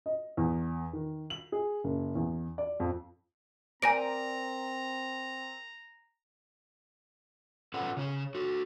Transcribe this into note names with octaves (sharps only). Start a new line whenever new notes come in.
D#5
E2
D#3
F#7
G#4
F#1
E2
D5
F2
C4 A#4 C5 D5 G#5 A#5 A#6 D7
C#4 F4 A4 B4 C#5 F#5
C#3 C#4 C#5
F#4 A4